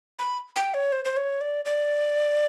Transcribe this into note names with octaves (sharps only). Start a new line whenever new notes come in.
B5
G5
C#5
C5
C5
C#5
D5
D5